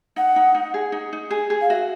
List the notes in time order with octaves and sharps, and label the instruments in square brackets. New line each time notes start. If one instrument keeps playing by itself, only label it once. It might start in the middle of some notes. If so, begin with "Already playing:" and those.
[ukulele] D#4 [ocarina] F#5
[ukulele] D#4
D#4
G#4
D#4
D#4
G#4
G#4
[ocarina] F5
[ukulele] F#4 [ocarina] E5